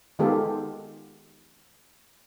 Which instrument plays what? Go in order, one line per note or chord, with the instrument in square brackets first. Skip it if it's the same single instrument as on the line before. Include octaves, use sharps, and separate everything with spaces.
[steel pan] D#3 G#3 B3 F4 G4 A4